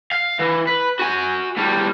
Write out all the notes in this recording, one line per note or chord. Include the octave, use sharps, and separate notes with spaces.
F5
E3
B4
F#4 G#5
A2 G3